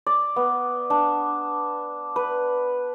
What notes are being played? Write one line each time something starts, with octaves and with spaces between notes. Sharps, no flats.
D5
B3
D4
B4